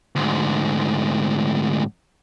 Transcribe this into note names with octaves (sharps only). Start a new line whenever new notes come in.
D2 G#2